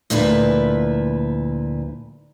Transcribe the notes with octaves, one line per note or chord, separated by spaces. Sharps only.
D2 A#2 F3 E4 F4 B4